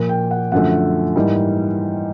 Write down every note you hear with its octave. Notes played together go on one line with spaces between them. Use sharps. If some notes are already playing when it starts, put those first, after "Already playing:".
Already playing: A#2 F3 A#3
G5
F#5
F#2 D3 F3 A3 F#5
G#2 E3 G3 A#3